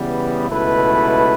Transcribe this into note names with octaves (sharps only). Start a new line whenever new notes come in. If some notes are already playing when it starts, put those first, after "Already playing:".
Already playing: C#3 E3 G3 B3
C#2 B2 A3 E4 B4